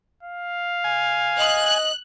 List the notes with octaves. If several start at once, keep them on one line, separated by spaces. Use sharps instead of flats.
F5
G#5
D#5 F#6